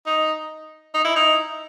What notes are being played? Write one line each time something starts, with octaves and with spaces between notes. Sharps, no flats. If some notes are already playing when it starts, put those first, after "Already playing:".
D#4
D#4
E4
D#4